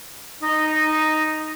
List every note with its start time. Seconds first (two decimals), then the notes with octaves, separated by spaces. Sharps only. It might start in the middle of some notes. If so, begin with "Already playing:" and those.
0.41 D#4